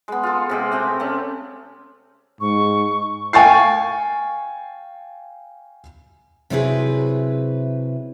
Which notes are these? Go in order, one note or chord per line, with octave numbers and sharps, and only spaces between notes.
G#3 B3
F4 A4
C3 G#3 G4
A3 C4 G4
A3 C#4
G#2 C#6
F5 G5 G#5 C#6 A6 C7
C3 F#3 C4 E4 G#4 B4